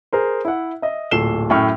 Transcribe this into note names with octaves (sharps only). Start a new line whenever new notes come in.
G#4 A#4 C5
E4 E5 F#5
D#5 E5
D1 A#2 A4 C7 E7 G7
F#2 A2 A3 G5 C#6 F6